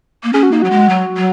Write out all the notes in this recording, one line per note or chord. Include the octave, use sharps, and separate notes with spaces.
A#3
C#4 G#4
F#4
A#3 D#4
F#3 F#4
G#3
F#3
F#3